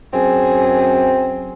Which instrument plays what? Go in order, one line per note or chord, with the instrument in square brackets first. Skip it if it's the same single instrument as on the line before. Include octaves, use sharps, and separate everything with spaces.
[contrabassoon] F#2 [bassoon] C4 [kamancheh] G#4